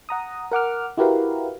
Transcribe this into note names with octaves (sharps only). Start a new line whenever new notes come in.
F#5 A#5 D#6
A#4 F#5 D6 F6
E4 F#4 G4 A#4 B4 F5